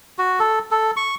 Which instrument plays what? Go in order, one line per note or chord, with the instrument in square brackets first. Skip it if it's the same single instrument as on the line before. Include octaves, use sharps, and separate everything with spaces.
[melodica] F#4
A4
A4
C#6